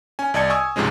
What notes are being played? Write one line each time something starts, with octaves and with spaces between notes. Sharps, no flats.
C#4 G#5
C2 D5 D#5 A5 G#6 C#7
G#5 C#6 D#6 E6 G#6
C#2 G#2 C3 F3 G#3 C#4